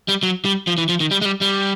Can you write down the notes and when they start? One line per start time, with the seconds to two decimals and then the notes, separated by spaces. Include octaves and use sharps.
0.08 G3
0.23 F#3
0.45 G3
0.67 F3
0.78 E3
0.89 F3
1.00 D#3
1.11 G3
1.22 G#3
1.25 G3
1.41 G3